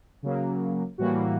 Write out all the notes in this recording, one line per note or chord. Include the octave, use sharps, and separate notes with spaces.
C#3 F#3 A#3
A2 E3 G3 A#3 F#4